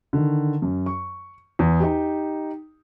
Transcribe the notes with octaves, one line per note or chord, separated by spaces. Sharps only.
D3 D#3
F#2
C#6
E2
D#4 G4